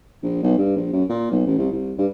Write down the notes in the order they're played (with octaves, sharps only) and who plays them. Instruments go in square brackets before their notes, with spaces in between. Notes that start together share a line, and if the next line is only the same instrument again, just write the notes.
[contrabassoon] A#1
B1
G2
A#1
F#2
A#2
B1
A1
C2
C2
G2